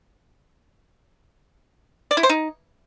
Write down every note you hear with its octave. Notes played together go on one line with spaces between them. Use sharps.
D5
E4
C5
D#4